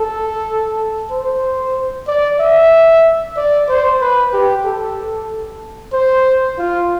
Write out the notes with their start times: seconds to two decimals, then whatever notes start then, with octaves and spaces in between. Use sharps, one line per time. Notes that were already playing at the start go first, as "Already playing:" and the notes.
Already playing: A4
1.11 C5
2.07 D5
2.40 E5
3.37 D5
3.69 C5
4.01 B4
4.33 G4
4.65 A4
5.93 C5
6.58 F4